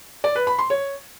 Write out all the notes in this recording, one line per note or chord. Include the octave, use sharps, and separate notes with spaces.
D5
B4
B5
C6
C#5